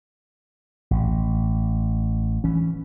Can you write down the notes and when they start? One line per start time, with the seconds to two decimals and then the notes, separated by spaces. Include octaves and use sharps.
0.91 A1
2.44 E3 C#4